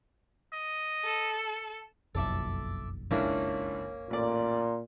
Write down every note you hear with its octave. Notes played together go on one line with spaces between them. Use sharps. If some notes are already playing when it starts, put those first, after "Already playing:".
D#5
A4
F#1 B1 F2 A4 D5 E5
C#2 A#3 C#4 D4 E4
A1 A#2 D5